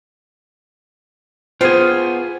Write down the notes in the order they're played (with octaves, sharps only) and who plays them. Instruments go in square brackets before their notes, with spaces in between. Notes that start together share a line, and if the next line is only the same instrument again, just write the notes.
[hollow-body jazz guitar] B3 C5 G5 [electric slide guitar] F4 G#4